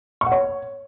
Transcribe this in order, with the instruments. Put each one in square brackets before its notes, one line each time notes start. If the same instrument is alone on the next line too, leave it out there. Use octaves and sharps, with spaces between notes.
[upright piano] C#6
F#5
C#5